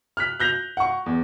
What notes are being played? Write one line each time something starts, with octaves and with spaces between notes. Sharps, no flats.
F6 F#6 B6
F#6 G6 A#6 F7
F#5 C#6
E2